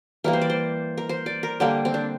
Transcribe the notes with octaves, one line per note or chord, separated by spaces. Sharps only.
E3 G3 A#3 A#4
C5
D5
C5
A#4
C5
D5
A#4
D3 G3 A#3 G4
C4
D4